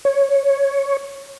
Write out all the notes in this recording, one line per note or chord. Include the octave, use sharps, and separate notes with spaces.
C#5